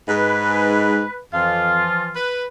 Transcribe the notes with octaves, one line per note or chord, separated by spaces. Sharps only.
G#2 G#3 B4
F2 E3 F3 F4 F5
B4